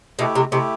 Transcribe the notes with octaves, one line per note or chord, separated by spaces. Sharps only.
B2 A3 E4 G4
C3
C3 A3 E4 G4